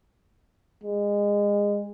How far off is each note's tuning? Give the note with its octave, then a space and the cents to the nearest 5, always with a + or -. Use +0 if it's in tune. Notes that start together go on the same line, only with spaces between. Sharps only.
G#3 -25